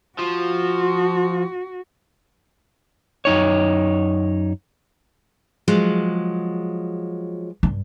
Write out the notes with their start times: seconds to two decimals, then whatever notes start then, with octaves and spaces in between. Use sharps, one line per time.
0.19 F3 F#4
3.25 F#2 D#4 C#5
5.68 F3 F#3 G#3
7.63 G2